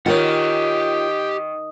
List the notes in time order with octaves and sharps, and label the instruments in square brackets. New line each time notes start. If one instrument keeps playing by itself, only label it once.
[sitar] D#3 [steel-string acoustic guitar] F4 A#4 C#5 [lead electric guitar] G4 F#5